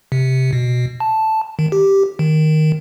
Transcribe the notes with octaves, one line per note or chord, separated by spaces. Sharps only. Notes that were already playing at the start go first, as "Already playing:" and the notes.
C3
B2
A5
D#3
G4
D#3